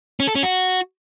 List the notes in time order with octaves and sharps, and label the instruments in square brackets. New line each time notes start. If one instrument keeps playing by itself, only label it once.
[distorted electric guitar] C#4
A4
C#4
F#4